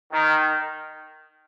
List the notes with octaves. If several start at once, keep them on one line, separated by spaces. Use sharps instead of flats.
D#3